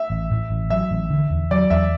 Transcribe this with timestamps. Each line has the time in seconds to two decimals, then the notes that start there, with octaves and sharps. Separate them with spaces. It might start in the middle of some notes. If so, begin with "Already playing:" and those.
Already playing: E5
0.10 A1
0.31 A2
0.50 A1
0.70 F#3 E5
0.91 A1
1.10 D3
1.30 E2
1.51 F#3 D5
1.70 E2 E5